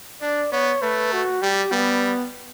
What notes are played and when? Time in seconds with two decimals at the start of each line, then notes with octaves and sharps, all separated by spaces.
0.22 D4 D5
0.52 B3 C#5
0.82 A3 B4
1.12 F#4
1.42 G3 G4
1.72 G3 B3